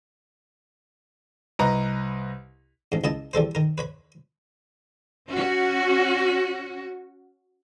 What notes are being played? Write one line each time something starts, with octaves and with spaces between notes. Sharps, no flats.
C2 B4 D#5 A#5
A1 G#2
C#2 E4 D#5 A5
E2 G3 A4 C5
D#3 A#4
B4 C#5 B5
C#4 F#4